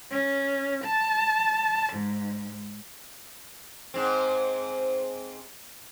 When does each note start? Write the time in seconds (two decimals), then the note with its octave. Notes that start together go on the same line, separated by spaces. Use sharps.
0.10 C#4
0.83 A5
1.93 G#2
3.94 G#2 C4